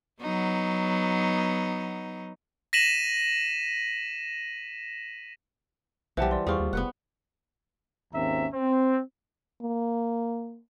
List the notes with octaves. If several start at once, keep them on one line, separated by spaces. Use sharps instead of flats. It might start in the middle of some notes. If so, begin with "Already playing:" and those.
F#3 B3 D#4
A#6 B6 D#7 E7 F#7
B1 E3 G3 C5 F#5 A5
D5 C6
E2 G3 F4 G#4 C5 C#6
D#2
F1 B3 B4 F#5
G#1 D#2 C4 C#4 E5 A#5
C4
A#3